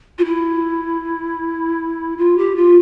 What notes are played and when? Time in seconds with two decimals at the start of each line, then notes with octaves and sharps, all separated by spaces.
0.18 F4
0.25 E4
2.17 F4
2.37 G4
2.55 F4